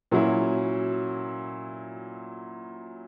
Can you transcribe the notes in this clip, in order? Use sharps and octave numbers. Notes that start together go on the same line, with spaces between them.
A#2 F#3 C#4 E4